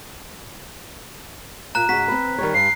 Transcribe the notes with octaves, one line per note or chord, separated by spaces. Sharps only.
A#2 A#5 F#6
G#2 C#3 F#4 B6
C4 B4
D#3 G3 C#5
G2 C7